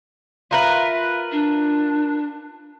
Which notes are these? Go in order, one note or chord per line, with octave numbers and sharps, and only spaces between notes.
F4 A#4 B4 E5
D4